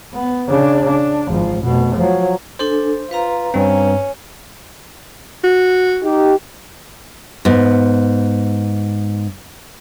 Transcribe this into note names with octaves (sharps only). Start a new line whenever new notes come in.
B3
C#3 D4
D4
G#1 F3
F1 B2
F3 F#3
D4 A4 C5 G#5
F4 B4 F5 A#5
G2 C4 C#4
F#4
D#4 G4
G#2 B3